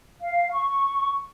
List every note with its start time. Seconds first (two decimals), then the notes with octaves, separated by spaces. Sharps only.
0.22 F5
0.53 C#6